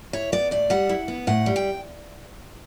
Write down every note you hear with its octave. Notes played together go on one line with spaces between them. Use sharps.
E4 C#5
B3 D5
A2 D5
G3 F#5
E4
B3
A2 F#5
G3
G5